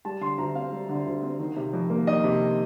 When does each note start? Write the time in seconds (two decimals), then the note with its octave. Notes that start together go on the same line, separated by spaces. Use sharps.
0.05 G3 A5
0.21 D3 C6
0.38 D2 A#5
0.55 C4 F5
0.72 G3
0.89 D3
1.06 D2
1.23 C4
1.40 D#3
1.56 C3
1.73 F2
1.90 A#3
2.07 D#3 D#5
2.24 C3